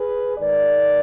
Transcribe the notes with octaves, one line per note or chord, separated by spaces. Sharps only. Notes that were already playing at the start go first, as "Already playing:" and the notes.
Already playing: G#4 B4
G#2 D#3 G#3 A#4 D5